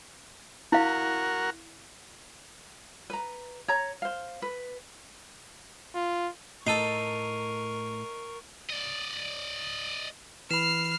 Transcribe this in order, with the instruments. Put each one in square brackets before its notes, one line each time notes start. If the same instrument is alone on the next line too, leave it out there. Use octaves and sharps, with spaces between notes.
[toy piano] E4 F5 [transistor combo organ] F#4 A#4
[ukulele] B4 A#5
C#5 A#5
C5 F5
B4
[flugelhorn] F4
[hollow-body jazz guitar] A2 [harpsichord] D#4 A4 [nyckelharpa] A#4 C#6 [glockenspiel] C7 D#7
[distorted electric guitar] D5 D#5
[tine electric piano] E3 [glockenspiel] B5 E7 [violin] F6 C7